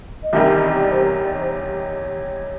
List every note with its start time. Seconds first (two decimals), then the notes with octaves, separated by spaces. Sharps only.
0.23 D#5
0.33 E2 C3 D#3 G3 E5
0.56 D#5
0.74 C#5
0.79 D5
0.92 C5
1.02 C#5
1.25 D5
1.33 C#5
1.42 C5
1.50 C#5